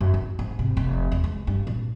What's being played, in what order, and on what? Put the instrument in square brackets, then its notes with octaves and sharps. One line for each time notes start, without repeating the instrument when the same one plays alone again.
[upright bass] F#2
D#3
G#2
C3
F1
E2
G#3
G2
A#2